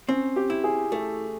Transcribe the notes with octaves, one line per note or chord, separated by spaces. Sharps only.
C4 C#4
G4
E4
G#4
A3 A4